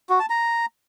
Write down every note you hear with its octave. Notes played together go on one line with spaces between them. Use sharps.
F#4
A5
A#5